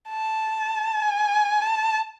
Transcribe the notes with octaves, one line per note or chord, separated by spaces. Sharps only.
A5
G#5
A5